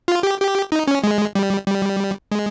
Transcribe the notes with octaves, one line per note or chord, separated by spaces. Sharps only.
F4
G4
G4
D#4
C#4
G#3
G3
G3
G#3